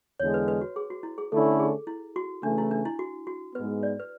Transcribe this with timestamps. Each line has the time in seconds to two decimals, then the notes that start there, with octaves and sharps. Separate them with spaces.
0.20 E2 D3 G#3 C#5
0.34 B4
0.48 B4
0.61 F#4
0.76 G#4
0.90 F#4
1.03 E4
1.18 G#4
1.32 D3 A3 C#4 E4 A4
1.59 G#4
1.87 E4
2.16 F#4
2.43 C#3 E3 A3 D4
2.58 E4
2.71 D4
2.85 E4
2.99 F#4
3.27 F#4
3.55 G#2 G#3 B3 B4
3.83 D5
4.00 B4